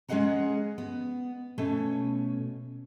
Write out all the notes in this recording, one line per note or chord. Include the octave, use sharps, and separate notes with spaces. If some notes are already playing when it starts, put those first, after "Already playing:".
G#3 C#4 G#4 D#5 F#5 A#5
B3
B2 A3 C#4